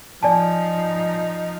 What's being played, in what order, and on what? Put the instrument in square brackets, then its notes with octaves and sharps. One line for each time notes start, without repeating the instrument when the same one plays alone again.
[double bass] F3 D#4 [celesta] D5 G#5 A5